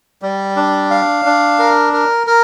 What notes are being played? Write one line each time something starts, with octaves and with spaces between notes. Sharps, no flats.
G3
D4
F5
D4
A#4
A#4
A#4